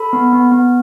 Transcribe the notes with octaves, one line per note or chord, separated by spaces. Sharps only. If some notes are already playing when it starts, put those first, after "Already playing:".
Already playing: A4 B5
B3
B3
B3